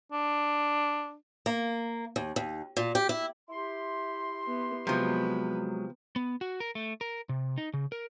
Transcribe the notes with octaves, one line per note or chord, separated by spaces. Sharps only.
D4
A#3
D#2
D#2
A#2
G4
E4
E4 G4 C6
B3
C3 F3 F#3 G#3 B3 B4
B3
F#4
A#4
A3
A#4
C3
D#4
C#3
A#4